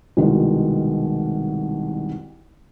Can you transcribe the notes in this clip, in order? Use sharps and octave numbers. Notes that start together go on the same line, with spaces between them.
C2 B2 D#3 G#3